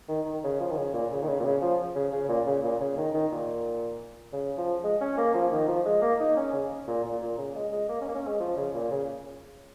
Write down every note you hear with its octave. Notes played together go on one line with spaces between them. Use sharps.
D#3
D#3
C#3
F3
D#3
C#3
A#2
C#3
D#3
C#3
A#2
C#3
F3
C#3
C#3
A#2
C#3
A#2
C#3
D#3
D#3
A#2
C#3
F3
G#3
C#4
A#3
F3
D#3
F3
G#3
A#3
D#4
C#4
C#3
A#2
A#2
A#2
C#3
G#3
G#3
A#3
C#4
A#3
C#4
G#3
F3
C#3
A#2
C#3